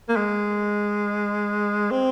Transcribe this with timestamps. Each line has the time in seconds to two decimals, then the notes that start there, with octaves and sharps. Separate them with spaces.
0.09 A#3
0.16 G#3
1.91 C4